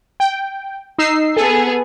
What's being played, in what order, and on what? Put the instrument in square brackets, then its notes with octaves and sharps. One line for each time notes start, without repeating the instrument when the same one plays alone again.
[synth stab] G5
D#4 E6 C7
[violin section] B3 G#4 [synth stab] A4